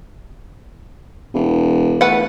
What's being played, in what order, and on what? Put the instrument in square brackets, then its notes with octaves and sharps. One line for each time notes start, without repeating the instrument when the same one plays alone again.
[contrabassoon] E1
[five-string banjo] A3 B4 F#5